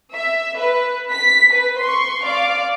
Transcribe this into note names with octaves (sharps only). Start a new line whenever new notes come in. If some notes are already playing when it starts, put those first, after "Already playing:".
E5
B4
B6
B4
C6 C#6
D5 F5 D6